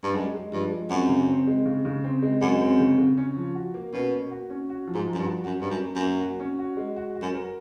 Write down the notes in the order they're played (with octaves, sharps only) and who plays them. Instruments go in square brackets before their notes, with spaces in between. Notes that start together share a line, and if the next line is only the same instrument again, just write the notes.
[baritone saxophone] G2
[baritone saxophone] F#2 [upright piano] G#3
[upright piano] G#3
[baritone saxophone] G2 [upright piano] F3
[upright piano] G#3
[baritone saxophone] F#2 [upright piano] C4
[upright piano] C#3
C4
G#3
C#3
C#3
C4
G#3
[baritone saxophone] F#2 [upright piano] G#3
[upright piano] C4
C#3
C#3
C#4
F3
F#4
A#3
[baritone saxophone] B2 [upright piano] C#4
[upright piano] A#3
F#4
C#4
F#4
F3
[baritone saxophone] G#2
[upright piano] F3
[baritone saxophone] F#2
G2
[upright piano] F#4
[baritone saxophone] F#2 [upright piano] F#4
[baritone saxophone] G2 [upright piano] C#4
[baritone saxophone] F#2
[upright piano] A#3
[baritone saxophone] F#2
[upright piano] A#3
F#4
C#4
F#4
G#3
F#4
F#4
[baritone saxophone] F#2
[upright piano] A#4